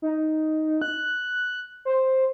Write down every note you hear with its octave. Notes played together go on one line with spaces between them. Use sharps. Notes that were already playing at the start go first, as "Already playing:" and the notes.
D#4
F#6
C5